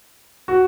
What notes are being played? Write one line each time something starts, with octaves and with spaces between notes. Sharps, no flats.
F#4